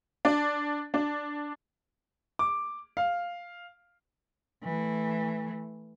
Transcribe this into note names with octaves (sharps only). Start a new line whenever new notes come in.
D4
D4
D6
F5
E3 A3